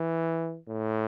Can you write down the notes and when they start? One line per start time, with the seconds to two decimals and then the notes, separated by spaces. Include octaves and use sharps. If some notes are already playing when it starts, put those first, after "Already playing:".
Already playing: E3
0.69 A2